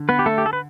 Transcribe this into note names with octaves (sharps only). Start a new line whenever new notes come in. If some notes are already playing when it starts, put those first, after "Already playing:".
Already playing: D3
B3 B4
G4
A3 A4
G4
A4
B4